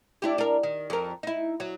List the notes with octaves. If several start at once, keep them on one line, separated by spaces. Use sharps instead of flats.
D4 E4 G4
D4 A#4
D#3
F2 A#4
D#4 E4
F#3